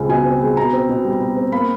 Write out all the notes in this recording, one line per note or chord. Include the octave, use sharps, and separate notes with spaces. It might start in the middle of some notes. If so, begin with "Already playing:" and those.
Already playing: C#2 G3 G#3 C4
B2 G#5
C4
G#3
B2 A#5
C4
B2
G3
B2
C4
A#3 B5